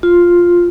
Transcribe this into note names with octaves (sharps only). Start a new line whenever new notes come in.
F4